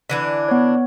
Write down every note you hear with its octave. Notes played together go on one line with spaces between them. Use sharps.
D3 E3 D4
B3 C#5